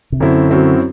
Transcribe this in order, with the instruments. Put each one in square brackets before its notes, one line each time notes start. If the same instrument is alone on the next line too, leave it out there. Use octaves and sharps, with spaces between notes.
[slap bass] C3
[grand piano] F#2 F#3 C4 E4 [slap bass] D3
[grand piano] F#2 F#3 C4 E4